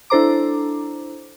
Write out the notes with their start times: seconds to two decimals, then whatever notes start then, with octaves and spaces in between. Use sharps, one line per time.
0.10 D4 E4 A4 C5 A#5 D6